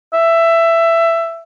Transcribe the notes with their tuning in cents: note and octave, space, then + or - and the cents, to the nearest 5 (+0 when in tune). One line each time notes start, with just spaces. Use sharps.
E5 +15